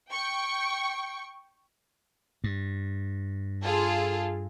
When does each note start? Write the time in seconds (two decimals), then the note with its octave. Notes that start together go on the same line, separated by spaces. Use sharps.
0.11 G5 C#6
2.44 G2
3.63 F4 G#4 A4